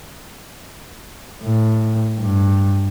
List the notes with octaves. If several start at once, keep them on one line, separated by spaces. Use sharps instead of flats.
A2
G2